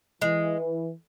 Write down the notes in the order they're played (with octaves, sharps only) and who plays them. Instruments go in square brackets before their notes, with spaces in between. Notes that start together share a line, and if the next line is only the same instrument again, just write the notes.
[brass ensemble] E3 [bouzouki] G#3